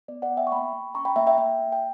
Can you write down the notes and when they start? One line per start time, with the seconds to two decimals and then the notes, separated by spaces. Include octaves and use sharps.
0.08 B3 D5
0.22 D5 F#5
0.30 B3
0.37 E5 G5
0.47 C#6
0.52 A#3 G5 B5
0.73 A#3
0.95 C#4 A#5 C#6
1.05 G5 B5
1.16 A#3 E5 G5
1.27 E5 G5
1.38 A#3 E5 G5
1.59 A#3
1.72 G5